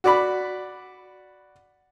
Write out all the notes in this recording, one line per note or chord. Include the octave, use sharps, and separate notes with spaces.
F#4 D5 B5